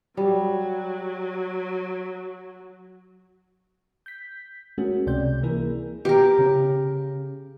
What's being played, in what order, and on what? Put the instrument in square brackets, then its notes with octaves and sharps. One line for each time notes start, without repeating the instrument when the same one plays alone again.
[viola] F#3 [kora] G3
[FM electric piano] G6 B6
G#3 A3 C#4 F#4 G#4 A#4
C#2 C3 D5 G6
E3 A#3 E4 G#4 A#4
[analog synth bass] B2 [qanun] G4 A#4
[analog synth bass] C#3